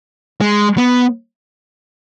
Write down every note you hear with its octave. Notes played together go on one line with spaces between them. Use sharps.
G#3
B3